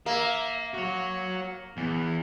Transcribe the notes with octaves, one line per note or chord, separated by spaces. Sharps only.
A#3 E5
F#4 C#5
E2 E3